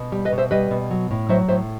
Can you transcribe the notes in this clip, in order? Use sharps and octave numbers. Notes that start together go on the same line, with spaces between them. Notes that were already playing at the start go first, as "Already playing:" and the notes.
Already playing: B2
G3
B4 D#5
B2
C5 E5
G3 B4 D#5
B2
F#3
A2
F#3 C5 E5
A2 C5 E5